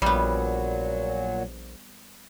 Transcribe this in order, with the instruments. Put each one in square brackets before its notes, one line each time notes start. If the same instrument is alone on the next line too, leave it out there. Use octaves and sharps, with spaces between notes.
[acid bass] A#1 [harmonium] A#2 F#3 [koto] G3 B3